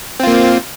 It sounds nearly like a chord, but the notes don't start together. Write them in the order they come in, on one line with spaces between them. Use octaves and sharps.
C4 F4 A#3